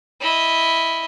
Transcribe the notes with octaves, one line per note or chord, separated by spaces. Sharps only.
E4 D#5